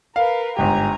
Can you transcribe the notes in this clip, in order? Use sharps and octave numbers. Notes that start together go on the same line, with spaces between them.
A#4 B4 F5
G1 G#2 G4 G#5 A#5